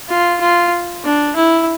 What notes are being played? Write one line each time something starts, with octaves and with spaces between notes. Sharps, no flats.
F4
F4
D4
E4